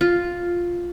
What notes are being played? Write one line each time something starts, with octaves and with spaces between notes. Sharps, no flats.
F4